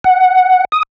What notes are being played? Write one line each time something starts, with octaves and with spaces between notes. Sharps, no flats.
F#5
D#6